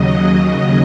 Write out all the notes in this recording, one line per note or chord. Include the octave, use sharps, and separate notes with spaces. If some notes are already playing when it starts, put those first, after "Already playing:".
Already playing: D#2 C#3 F#3 D#5